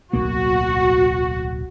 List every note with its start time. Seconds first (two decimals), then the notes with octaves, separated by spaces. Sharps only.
0.13 D1 B1 A#3 F#4